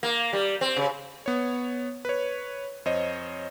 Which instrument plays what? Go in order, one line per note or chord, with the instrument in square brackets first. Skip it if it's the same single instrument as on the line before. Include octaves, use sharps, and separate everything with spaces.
[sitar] A#3
G3
C4
C#3
[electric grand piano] B3 C#5
B4 C#5
F2 C5 C#5 D#5